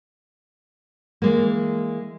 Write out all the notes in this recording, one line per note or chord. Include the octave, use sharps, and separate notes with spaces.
E3 G#3 A#3